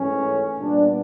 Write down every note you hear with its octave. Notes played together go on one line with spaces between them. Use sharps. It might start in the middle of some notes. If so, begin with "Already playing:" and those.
Already playing: G#2 E3 A3 C#4
A#2 G3 B3 D4